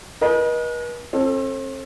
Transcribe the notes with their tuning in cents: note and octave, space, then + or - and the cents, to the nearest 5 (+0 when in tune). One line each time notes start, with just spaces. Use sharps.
B4 -45 D#5 +0 G#5 +45
C4 +40 A4 +0